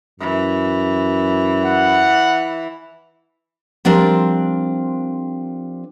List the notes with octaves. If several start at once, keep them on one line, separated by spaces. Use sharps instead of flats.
F#2 E3
F#5
F3 G3 C4 D4 A#4